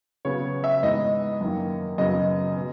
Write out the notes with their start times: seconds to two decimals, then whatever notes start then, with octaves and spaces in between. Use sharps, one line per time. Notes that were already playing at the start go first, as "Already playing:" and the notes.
0.25 C#3 F#3 B3 C#5
0.64 E5
0.82 G#2 E3 B3 D#5
1.41 F#2 D#3 A#3
1.98 F#2 C#3 F#3 B3 D#5
2.56 B2